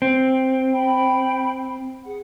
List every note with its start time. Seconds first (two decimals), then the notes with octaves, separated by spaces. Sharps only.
0.02 C4
0.73 G5 B5
2.04 G#4 F#5